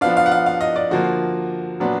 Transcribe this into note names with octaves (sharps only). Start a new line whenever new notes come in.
F3 B3 D4 F5
F5
F#5
F5
F5
D#5
D5
D3 F3 A#3 F#4
A#2 F#3 B3 D4